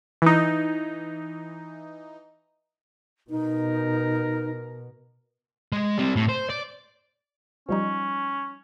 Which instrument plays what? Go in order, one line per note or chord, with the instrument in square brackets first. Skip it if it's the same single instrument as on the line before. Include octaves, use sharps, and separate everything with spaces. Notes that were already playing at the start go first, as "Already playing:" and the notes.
[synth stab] E3 D#4
[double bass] B2 [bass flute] D#4 [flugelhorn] A#4
[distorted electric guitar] G#3
G3 C4
A2
C5
D5
[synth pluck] F3 G3 D#4 [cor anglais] C#4